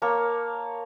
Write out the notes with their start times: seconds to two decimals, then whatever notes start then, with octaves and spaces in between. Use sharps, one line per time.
0.02 A#3 C#5 A5